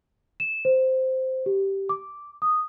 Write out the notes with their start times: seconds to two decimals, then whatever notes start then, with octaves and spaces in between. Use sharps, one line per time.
0.40 E7
0.65 C5
1.46 G4
1.89 D6
2.42 D#6